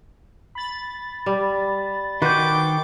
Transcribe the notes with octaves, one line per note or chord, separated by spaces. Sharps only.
B5 A6
G3
D#3 F#4 B4 C5 G5 D6 G6